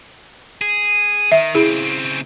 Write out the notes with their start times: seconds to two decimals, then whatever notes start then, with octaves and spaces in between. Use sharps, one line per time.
0.61 G#4
1.32 D#3 E5
1.55 C#3 C4 E4 G#4